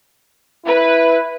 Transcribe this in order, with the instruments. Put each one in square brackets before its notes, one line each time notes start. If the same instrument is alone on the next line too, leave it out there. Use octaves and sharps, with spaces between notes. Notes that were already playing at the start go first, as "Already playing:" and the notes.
[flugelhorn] E4 [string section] B4